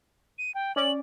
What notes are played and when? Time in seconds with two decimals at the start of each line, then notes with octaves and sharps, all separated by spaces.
0.38 D#7
0.55 G5
0.76 C#4 D5 F#7